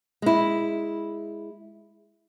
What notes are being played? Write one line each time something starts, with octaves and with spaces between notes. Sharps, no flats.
G#3 E4